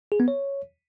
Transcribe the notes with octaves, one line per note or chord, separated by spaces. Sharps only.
G#4
B3
C#5